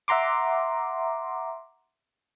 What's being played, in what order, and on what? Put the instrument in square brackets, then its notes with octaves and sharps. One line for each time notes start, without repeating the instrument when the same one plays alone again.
[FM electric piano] E5 F#5 A#5 C6 D6